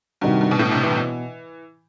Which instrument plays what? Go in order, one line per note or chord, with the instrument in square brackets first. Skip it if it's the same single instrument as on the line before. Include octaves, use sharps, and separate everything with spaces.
[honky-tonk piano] G2 [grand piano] C3 D#3 G3 D#4 F#4
[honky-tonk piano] G2
B2
A2
C3
E3
[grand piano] B2